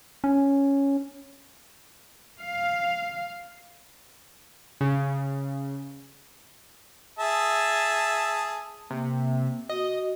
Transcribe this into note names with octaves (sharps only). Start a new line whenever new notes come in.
C#4
F5
C#3
G#4 E5 A5
C3 A#3
F#4 D#5